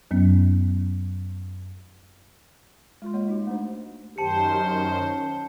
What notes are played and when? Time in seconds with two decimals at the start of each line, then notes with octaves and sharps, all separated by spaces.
0.11 F#2 F#3 B3 C#4
3.02 G#3 F4 C6
3.14 G#3 A#3 C#5 D#5
3.28 D#4 F#4
3.47 A3 D4 C5
4.18 F#2 D#3 G4 C5 A5 C#7
4.67 C#4